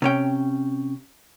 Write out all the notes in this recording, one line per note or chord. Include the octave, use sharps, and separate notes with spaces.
C3 C#4 G5